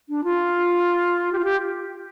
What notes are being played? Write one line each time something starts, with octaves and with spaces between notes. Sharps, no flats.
D4
F4
G4
F4
G4